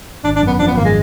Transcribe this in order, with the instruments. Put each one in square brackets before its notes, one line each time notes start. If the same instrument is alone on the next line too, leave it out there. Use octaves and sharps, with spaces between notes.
[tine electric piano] G#1 [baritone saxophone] D4
[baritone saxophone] D4
[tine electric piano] F#2 [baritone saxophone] B3
[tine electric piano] F3 [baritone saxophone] D4
[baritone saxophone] B3
[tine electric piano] G#1 [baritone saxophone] A#3
[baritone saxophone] G#3